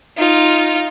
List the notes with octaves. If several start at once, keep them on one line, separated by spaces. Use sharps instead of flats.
D#4 F4